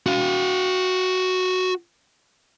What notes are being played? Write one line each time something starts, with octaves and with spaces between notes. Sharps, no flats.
F#4 F5